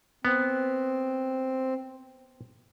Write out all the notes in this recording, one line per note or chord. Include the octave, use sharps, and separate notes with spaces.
B3 C4